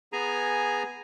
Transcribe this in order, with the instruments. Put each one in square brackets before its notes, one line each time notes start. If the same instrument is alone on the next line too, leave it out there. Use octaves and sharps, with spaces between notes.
[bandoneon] B3 G#4 G#5 A#5